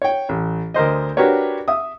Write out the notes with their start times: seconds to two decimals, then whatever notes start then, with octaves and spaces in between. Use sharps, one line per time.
0.02 C#5 G5
0.29 A1
0.74 D2 A#4 C5 D#5
1.17 D4 F#4 G4 A#4 B4 C#5
1.68 E5 D#6